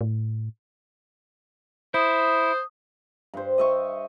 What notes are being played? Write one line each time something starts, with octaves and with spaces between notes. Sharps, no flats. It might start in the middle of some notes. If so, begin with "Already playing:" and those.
A2
E4 C5 D#6
G2 C5
D#5 E5 C#6